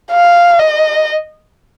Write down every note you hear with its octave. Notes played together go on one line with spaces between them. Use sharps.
F5
D#5